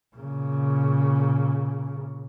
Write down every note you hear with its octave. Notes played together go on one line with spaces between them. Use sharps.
A#2 C#3